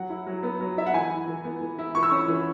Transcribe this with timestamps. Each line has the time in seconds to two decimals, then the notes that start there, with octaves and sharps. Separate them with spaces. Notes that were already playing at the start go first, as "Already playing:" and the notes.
Already playing: F#3 F#5
0.10 E4
0.27 F#3
0.43 B3
0.61 F#3
0.77 E4 E5
0.86 F#5
0.94 E3 G#5
1.11 E4
1.28 E3
1.44 B3
1.61 E3
1.79 E4
1.95 E3 C#6
2.03 E6
2.09 C#4 C#6
2.28 E3